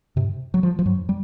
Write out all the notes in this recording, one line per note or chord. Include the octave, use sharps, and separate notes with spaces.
G2 C3
F#3
F3
F3
G2 F#3
F#2
G3